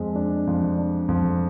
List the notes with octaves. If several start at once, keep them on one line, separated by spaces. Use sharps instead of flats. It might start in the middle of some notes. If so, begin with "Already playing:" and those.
Already playing: F2 G#3
D4
F2
D4
F2